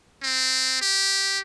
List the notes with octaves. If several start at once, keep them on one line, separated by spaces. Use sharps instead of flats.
C4
G4